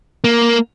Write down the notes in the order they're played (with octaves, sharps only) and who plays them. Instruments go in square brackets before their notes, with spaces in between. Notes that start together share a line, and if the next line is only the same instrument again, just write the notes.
[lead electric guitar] A#3